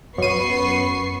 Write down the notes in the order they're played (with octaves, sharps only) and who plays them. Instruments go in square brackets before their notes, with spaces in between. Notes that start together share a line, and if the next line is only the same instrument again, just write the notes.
[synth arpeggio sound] F#2 D#7 [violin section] B3 C#6 C7